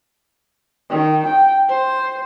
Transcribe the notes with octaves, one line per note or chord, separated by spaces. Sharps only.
D#3
G5
C5